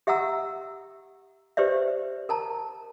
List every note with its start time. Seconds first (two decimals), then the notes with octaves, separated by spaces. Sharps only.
0.07 G4 E5 F#5 A#5 E6
1.57 G4 B4 C5 D5 E5
2.29 A#4 A5 A#5